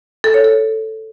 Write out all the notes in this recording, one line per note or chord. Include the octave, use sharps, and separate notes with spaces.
A4
C#5
A4